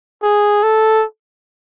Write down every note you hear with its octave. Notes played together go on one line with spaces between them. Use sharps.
G#4
A4